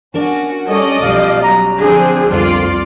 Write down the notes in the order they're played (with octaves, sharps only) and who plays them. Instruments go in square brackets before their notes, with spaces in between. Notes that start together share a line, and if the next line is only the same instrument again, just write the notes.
[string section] C#4 F#4 [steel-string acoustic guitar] D4 A#4 A5
[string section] G3 C#4 A4 [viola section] D5 D#5
[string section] B1 F3 [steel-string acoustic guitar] G3 C#4 [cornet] F5
[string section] F#3 [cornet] A#5
[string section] D3 F3 [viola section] C4 G#4 [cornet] D4
[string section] C2 D5 [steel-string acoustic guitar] F2 D3 A#3 [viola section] F4